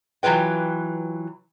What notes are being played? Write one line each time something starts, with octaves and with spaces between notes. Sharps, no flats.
E3 F#3 F4 B4 G5